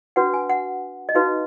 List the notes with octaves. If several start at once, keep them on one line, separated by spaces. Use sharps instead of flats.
D4 F#4 B4 F#5
G#5
F#5
D#5
D#4 F#4 B4 F5